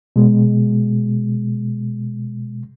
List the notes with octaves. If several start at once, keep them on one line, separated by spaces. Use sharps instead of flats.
B2 G#3